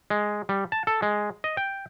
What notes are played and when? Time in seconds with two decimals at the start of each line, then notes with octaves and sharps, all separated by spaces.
0.10 G#3
0.49 G3
0.72 A5
0.87 A4
1.02 G#3
1.44 D#5
1.57 G5